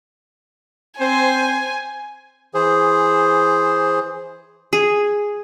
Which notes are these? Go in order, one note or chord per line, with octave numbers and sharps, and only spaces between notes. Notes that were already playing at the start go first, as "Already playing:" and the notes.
C4 C5 G#5
E3 G#4 C5
G#4